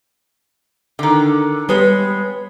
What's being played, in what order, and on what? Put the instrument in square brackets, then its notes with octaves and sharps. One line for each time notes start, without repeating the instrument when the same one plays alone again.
[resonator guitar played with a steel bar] D3 D#3
[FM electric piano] G3 B4 [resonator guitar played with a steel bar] G#3 B3 C#5